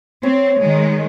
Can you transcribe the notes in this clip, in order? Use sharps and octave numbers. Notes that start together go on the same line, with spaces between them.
C4 C#5
D#3 G#3